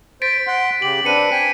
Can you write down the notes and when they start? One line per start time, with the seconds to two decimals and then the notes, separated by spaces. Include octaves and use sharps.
0.22 C5 A6 B6 D7
0.47 F#5 C6
0.82 C#3 G4 F#7
1.05 C4 D4 B4 C#7 D#7
1.32 G5 G#5 B6